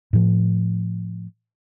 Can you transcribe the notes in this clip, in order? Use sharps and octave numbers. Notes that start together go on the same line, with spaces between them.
A2 F3